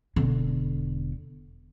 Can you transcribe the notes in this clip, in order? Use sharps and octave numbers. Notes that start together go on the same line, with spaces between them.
E1 D3